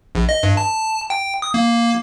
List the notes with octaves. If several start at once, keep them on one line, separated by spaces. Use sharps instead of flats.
A#1
D#5
G2
A5
G5
D#6
A#3